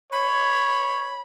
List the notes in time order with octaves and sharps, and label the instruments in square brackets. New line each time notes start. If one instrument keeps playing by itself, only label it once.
[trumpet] C#5 [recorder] B5